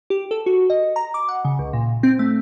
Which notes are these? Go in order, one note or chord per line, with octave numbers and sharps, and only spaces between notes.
G4
A4
F#4
D#5
A#5
D6
F#5
C#3
C#2
A#2
C4
A3